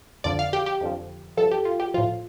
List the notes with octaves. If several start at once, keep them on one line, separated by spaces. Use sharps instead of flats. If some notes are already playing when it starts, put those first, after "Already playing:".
F2 D3 F3 D5
F5
G4
G4
F2 D3 F3
G2 F3 A4
G4
F4
G4
A2 F3 F4